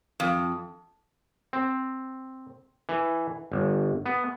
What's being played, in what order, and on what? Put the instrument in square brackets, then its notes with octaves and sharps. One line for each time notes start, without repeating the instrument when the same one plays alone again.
[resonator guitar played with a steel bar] F2
[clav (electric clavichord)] C4
E3
G1
B3